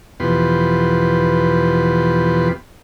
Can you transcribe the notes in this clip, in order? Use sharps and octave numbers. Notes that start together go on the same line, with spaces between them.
E2 B2 F3 G4 B4 C6